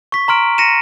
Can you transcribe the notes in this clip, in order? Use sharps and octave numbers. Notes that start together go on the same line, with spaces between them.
C#6 B6
A#5 C6 F6 D7
A#6 C#7 D#7 E7